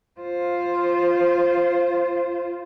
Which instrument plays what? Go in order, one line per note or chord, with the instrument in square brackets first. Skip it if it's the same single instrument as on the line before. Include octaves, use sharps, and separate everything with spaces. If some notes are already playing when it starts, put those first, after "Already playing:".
[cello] F4 C5